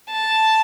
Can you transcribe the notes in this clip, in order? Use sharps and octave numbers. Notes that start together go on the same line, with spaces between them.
A5